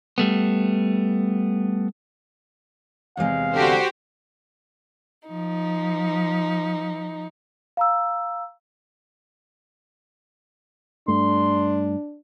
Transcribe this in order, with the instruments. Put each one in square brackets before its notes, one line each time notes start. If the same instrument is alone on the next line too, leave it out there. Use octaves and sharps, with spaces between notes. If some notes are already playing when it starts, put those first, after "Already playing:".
[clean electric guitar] G3 A3 B3
[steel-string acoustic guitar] E2 C3 G#3 [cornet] F5
[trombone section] D3 [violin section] F#4 G4 C5
[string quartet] F3 D#4
[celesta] F5 A#5 E6
[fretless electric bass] G2 A3 [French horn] D4 [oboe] C6